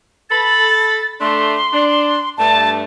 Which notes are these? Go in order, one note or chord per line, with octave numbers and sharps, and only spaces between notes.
A4 B5 A6
A3 D4 C6
D4
G2 A3 A5